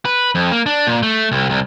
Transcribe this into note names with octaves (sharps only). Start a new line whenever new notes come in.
B4
F2
A#3
D4
A#2
A3
C2
C2